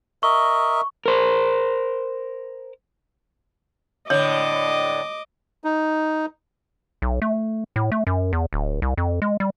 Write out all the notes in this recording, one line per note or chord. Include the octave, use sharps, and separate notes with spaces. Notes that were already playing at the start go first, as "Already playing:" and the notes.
A#4 D#5 E5 C#6
A#4 C5
A2 D3 C#5 D#5 D6
D#4
B1
A3
A2
A3
F#2
E2
D1
C2
F2
G#3
G3